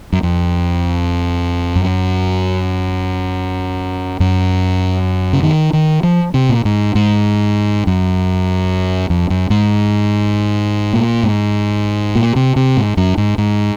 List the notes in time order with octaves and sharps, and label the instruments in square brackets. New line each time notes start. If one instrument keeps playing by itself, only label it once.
[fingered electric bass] F#2
F2
F#2
F#2
C#3
D#3
D#3
F3
C3
A#2
G#2
G#2
F#2
F2
F#2
G#2
A#2
G#2
A#2
C3
C3
G#2
F#2
G#2
G#2